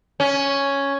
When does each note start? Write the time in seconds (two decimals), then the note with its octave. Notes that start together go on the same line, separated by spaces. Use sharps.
0.20 C#4